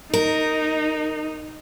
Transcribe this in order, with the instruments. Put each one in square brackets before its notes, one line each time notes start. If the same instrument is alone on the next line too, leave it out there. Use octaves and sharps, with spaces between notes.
[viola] D#4 [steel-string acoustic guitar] A#4